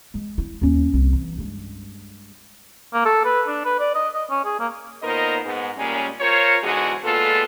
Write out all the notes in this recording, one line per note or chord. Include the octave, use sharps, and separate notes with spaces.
G#3
E4
D#2 C#4
C2
E3
G2 G#3
A#3
A4
B4
D4
B4
D5
D#5
D#5
C#4
G#4
A#3
A#2 B3 D#4 A#4 C5 D#5
G#2 B3
A#2 G3 G#3 A#3 C#4
F4 A#4 C5 C#5
E2 G#2 D3 G#3 F#4 G#4
A#2 G#3 B3 F4 A4